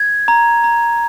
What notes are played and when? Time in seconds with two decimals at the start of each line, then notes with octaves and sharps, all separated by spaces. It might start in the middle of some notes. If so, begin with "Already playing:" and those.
Already playing: G#6
0.28 A#5
0.64 A#5